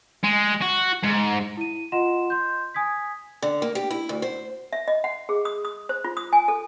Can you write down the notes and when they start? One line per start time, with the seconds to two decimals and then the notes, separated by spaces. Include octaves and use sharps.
0.23 G#3
0.61 F#4
1.04 G#2
1.57 E4 D#7
1.92 F4 D#5 F#5 C6 E7
2.30 C6 G6
2.74 G#5 D#6 G#6 B6
3.42 D3
3.62 A#3
3.75 G4
3.91 E4
4.09 D2
4.22 C5
4.73 E5
4.88 D#5
5.04 F#5
5.29 G#4
5.45 D#6
5.65 D#6
5.89 C5
6.04 F4
6.17 D#6
6.33 G#5
6.48 A4